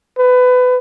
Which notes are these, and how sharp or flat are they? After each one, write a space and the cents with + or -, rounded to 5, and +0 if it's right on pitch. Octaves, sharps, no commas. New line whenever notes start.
B4 +25